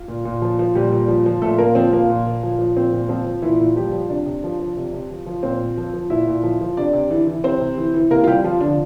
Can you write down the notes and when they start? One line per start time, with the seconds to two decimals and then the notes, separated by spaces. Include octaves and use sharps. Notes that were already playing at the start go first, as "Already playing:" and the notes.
Already playing: F4
0.08 A#2
0.25 A#2
0.42 F3
0.59 F3
0.75 A#2 G3 G4
0.92 A#2
1.08 F3
1.26 F3
1.42 A#2 A3 A4
1.58 A#2 A#3 A#4
1.75 F3 C4
1.93 F3 A#3
2.10 A#2
2.26 A#2
2.43 F3
2.59 F3
2.76 A#2 C4
2.93 A#2
3.09 F3 C4
3.26 F3
3.42 A#2 E3 E4
3.60 A#2
3.76 F3 G3 G4
3.92 F3
4.09 C3 D4 D5
4.26 C3
4.44 F3
4.59 F3
4.77 C3
4.93 C3
5.10 F3
5.26 F3
5.43 A#2 C4 C5
5.61 A#2
5.77 F3
5.93 F3
6.10 A#2 E4 E5
6.27 A#2
6.43 F3
6.61 F3
6.77 C3 D4 D5
6.93 C3
7.11 E3
7.27 E3
7.44 C3 C4 C5
7.61 C3
7.78 E3
7.94 E3
8.11 C3 A#3 A#4
8.24 F4
8.27 C3 G3 G4
8.44 F3 F4
8.60 D3 F3 D4